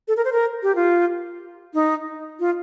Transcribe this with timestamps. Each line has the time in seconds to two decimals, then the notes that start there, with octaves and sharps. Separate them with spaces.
0.08 A4
0.17 A#4
0.25 C5
0.33 A#4
0.63 G4
0.75 F4
1.74 D#4
2.40 F4